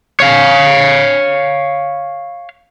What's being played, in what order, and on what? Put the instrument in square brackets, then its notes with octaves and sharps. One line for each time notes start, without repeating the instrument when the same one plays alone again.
[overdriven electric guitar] C#5 F5